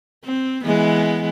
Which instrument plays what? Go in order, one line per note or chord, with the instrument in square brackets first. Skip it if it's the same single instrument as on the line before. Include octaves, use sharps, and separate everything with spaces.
[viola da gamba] C4
E3 G#3 B3